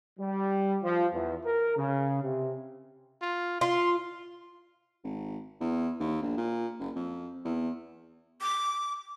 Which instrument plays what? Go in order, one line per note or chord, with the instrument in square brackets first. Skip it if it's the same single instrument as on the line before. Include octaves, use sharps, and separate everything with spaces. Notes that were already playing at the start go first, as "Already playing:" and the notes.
[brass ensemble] G3
F3
E2
A#4
C#3
C3
[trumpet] F4
[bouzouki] F4 [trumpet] C6
[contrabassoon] G#1
E2
D#2
A#1
A#2
F#1
F2
E2
[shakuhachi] D6